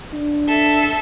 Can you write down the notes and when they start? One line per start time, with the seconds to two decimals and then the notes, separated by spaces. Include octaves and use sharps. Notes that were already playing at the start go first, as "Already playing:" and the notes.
0.14 D4
0.47 A4 E5